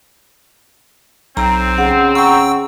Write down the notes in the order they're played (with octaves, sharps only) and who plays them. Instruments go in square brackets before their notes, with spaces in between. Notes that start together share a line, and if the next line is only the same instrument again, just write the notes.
[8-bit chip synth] B1 [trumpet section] C4 [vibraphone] A#5
[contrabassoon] C#3 [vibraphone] F#5
[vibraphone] F#5 A#5 C#6 [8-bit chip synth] G5 E6